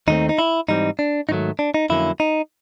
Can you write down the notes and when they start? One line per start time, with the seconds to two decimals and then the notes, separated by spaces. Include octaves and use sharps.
0.07 D#2 D#3 F#3 A3 C4 D#4
0.29 D#4
0.38 E4
0.68 G#2 E3 G3 C4 D#4
0.99 D4
1.29 G#2 D#3 F#3 A3 D#4
1.59 D4
1.74 D#4
1.89 F2 D3 F#3 A#3 C#4 E4
2.20 D#4